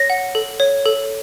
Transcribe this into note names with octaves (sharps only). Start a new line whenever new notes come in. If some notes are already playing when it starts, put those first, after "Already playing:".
Already playing: C#5 A#6
F#5
A4
C#5
A4